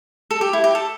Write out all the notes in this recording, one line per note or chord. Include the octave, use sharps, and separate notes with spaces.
A4
G4
E4
G4
A4